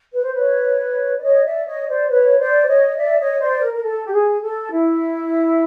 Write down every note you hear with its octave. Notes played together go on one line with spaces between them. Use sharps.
B4
C5
B4 C#5
D5
C#5 D#5
D5 E5
C#5 D#5
C5 D5
B4 C#5
C5 D5
C#5 D#5
D5 E5
C#5 D#5
C5 D5
A#4
A#4
A4
G4
G#4
A4
E4